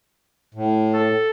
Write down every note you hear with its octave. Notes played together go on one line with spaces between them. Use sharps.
A2
A4